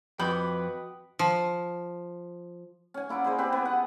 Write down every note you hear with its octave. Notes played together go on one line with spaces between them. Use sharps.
F2 F#4 B4 D#5 G5 B5 D6 G6
F3
C#4 G#5
A#3 E4 D5 F#5
E4 G#4 C5 D#5
C4 G4 B4
B3 B4 G#5
F#5